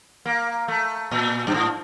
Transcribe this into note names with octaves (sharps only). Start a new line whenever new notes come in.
A#3
A3
A#2
G2
A2